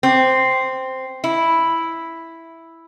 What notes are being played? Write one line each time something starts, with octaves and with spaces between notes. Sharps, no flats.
C4
E4